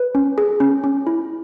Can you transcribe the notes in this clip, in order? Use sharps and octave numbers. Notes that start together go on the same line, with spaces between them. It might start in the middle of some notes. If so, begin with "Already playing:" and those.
Already playing: B4
C#4
G#4
C#4
C#4
E4